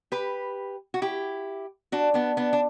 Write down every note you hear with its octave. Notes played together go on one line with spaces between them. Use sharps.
G4 B4
F#4
E4 G4
D4 F#4
B3 D4
B3 D4
D4